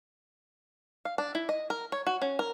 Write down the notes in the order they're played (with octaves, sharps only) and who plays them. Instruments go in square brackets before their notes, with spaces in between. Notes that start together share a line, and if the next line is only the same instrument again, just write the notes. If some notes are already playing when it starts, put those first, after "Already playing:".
[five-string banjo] F5
D4
E4
D#5
A#4
C#5
F#4
C#4
A#4